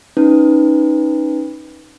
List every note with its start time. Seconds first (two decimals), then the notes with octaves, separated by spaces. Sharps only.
0.17 C#4 D#4 B4